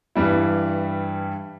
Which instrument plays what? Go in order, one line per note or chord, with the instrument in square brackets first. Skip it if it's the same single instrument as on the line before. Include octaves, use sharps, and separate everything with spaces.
[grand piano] G2 E3 G3 E4